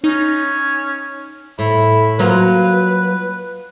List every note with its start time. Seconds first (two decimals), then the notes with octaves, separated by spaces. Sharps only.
0.04 C#4 D#4
1.59 A2 E4
2.19 F#3 A#3 F4 B4